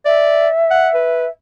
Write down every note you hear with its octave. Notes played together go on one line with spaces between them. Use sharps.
D5 E5
F#5
B4